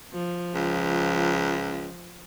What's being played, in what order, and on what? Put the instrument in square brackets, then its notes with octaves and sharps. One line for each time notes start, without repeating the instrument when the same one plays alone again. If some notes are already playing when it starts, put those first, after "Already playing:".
[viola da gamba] F3
[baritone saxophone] C#2